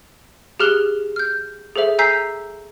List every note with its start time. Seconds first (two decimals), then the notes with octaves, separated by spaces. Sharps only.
0.60 G4 G#4 F6 F#6 G7
1.16 F6 G6
1.76 G#4 A4 C5 E5
1.99 G#5 A#5 E6 G6 B6 C7